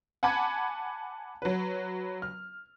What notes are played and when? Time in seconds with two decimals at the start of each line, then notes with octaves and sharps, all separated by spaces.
0.23 F#5 G#5 A5 B5 D6 G#6
1.42 F#3 B4
2.22 F6